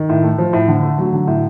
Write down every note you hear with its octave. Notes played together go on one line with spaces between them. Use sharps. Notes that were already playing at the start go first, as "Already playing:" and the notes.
Already playing: D#3
A2
A3
F3
A2
D3
A3
F#3
D3
A2